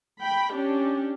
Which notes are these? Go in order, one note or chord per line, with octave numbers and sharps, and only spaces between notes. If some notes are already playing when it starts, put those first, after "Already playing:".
G5 B5
C#4 D4 G4